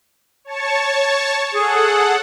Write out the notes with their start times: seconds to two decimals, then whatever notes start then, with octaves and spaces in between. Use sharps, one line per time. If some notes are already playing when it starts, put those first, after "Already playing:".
0.45 C#5 A5 C#6
1.54 G#4 A4 F#5